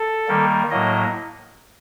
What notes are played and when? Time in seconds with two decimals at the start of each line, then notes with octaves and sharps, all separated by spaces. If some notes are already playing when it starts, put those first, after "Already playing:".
Already playing: A4
0.28 D#3 G3 A#3
0.70 A2 F#3 A#3 D#5